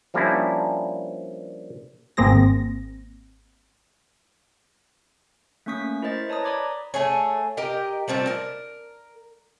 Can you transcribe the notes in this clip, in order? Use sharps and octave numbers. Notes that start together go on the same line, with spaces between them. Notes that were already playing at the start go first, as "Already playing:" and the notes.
F3 G3 A#3 C#4 D4 E4
G#1 A#3 C4 G#4 A#6
A3 A#3 C#4 C#6 D#6 B6
E4 A#4 C5 D#5 A6
B4 C#5 A5 A#5 D#6
D5 A#5 B5 D6 G#6
A3 G#4 C#5
G4 A#4 D#5 G5
G3 A3 C4 F4
A#4